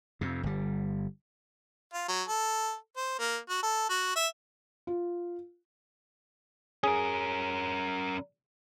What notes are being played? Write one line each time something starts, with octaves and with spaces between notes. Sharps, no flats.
F2 C3
G1 G3
F4
F#3
A4
C5
A#3
F#4
A4
F#4
E5
F4
C#4 G#4 A#4